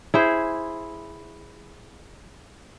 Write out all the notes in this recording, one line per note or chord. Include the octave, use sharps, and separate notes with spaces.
E4 G#4 C5